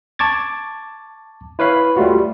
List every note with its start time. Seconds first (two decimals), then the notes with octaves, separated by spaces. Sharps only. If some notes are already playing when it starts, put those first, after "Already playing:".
0.19 A5 C#6 D6 G#6 A6
1.59 E4 B4 C#5 F5 B5
1.97 G3 A3 F4 F#4